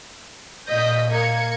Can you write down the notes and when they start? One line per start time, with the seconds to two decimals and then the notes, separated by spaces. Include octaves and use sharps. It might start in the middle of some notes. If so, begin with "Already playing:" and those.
0.68 A#2 D#5 G6 B6
1.10 A#3 G#6 C#7